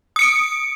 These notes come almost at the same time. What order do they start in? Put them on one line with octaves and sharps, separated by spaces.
D#6 C#7 D7